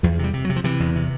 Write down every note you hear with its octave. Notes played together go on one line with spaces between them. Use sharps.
E2 F3
C3 G3
C3
F#3
C3
F3
C3 E3
E2
C3